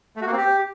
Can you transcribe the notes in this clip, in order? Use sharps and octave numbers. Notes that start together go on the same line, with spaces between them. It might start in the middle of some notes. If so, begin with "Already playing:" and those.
A3
F#4
A#3
C4
G4